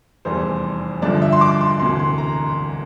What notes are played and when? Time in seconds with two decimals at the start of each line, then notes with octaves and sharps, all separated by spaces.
0.25 F1 E2 E3 G3 C5
1.02 G1 G2 D3 F3 D5
1.22 E5
1.32 C6
1.41 D6
1.61 C6
1.80 E1 D2 C3 E3 C6
1.99 C6
2.18 A#5